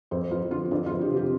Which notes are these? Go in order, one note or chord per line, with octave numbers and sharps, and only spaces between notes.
F2 C5
F2 F4
D3 F4
F2 D4
F4
F2
G4
C3
G4